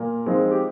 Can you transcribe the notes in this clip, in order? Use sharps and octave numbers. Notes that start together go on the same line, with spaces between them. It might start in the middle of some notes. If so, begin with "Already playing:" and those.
Already playing: A#2 A#4
F3 G#3 C4 D#4
G4